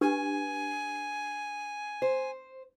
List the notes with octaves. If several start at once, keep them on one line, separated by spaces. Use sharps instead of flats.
D4 G4 B4 G#5
C5